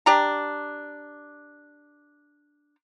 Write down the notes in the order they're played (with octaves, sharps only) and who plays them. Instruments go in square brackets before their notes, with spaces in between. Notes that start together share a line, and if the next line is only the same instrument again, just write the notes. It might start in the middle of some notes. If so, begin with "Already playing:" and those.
[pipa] D4 G4 A#5